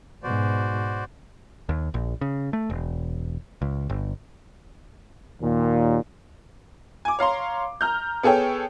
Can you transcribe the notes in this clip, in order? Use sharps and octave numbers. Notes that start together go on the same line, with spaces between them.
G#2 B2 F#4 C5 D5
D#2
A#1
C#3
A3
E1
C#2
G1
D#2 A#2
G#5 D6
C#5 F5 A#5 C6
A#5 F6 G6
B3 G#4 A4 C#5 G5